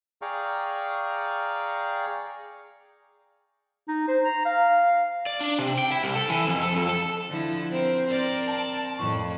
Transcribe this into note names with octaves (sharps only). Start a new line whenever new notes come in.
G#4 D5 F5 G5 A#5 C#6
D#4
C5
A#5
F5
D5
D4
C3
G5
E4
C2
A4
E3
F2
A4
F2
A4
D3 F3 E4
C4 A#4 C5
C4 A#4 D5
A5
F2 A2 C#6